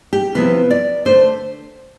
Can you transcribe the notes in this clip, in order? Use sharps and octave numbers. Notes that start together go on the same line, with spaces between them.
G4
C3 F3 B3 E4 B4
D5
D3 A3 D4 C5